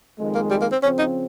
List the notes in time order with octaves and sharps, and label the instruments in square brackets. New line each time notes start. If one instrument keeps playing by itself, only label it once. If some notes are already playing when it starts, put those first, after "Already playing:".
[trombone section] F2 D#3 G#3
[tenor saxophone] A#3
G3
A#3
C4
[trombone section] C#3 F3 C4 [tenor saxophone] C#4
[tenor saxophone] D#4